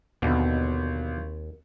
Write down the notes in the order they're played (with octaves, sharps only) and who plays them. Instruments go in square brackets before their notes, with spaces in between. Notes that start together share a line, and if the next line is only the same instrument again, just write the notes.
[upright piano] G#1 [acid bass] D#2 [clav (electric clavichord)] B2 D3 B3